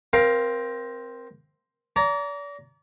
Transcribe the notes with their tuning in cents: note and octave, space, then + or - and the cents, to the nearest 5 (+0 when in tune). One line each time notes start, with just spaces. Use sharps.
C4 +0 A#4 +20 F5 +0
D5 -40 A#5 +0